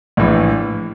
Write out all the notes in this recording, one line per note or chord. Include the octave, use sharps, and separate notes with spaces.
A#1 A2 E3